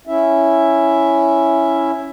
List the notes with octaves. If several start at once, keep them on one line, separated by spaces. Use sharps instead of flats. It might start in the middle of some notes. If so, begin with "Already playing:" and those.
C#4 E4 E5